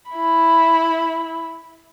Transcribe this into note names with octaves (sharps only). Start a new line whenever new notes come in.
E4 B5